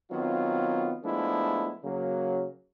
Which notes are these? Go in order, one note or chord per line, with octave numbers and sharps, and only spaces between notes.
D#3 F#3 B3 C4 F4
F3 G#3 A3 B3 D4 E4
C#3 F#3 A#3